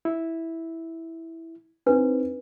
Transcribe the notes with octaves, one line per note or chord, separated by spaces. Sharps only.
E4
C4 D4 D#4 B4